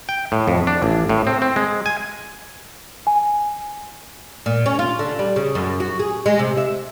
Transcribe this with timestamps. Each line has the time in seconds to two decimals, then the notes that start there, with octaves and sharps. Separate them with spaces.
0.09 G5
0.32 A2
0.47 F2
0.67 D4
0.82 A1
1.09 A2
1.27 C4
1.42 C4
1.56 G#3
1.86 G#5
3.07 G#5
4.46 A#2
4.66 C#4
4.79 F4
4.99 D3
5.19 G3
5.36 C#3
5.55 F#2
5.80 F#4
5.99 G#4
6.26 G#3
6.39 C3
6.57 E5